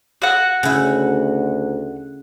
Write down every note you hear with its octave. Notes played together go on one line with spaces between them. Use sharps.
F#4 F#5
D2 C#3 E4